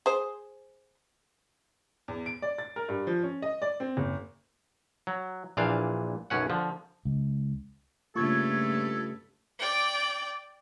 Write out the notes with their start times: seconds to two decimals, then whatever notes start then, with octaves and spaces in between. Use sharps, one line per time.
0.06 G#4 C5
2.08 E2
2.26 D7
2.42 D5
2.58 A6
2.76 A#4
2.89 G2
3.07 F3
3.23 C#4
3.42 D#5
3.62 D5
3.80 C4
3.97 F#1
5.07 F#3
5.57 A#1 A#2 E3 D4 F5
6.30 B1 F#2 C#4 F#5
6.50 D3 F3
7.05 C#2
8.15 G2 C#3 A3 A#3 F4 A4 C#6 G#6
9.59 D5 G5